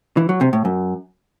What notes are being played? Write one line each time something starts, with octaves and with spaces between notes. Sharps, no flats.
E3
F#3
C3
A2
F#2